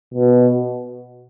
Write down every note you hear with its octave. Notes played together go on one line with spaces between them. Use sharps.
B2